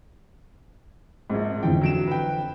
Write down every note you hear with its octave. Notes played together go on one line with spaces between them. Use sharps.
A#1 G#2 C4 G#4
F2 D3 E3 G5
F#3 D7 E7
B4 G5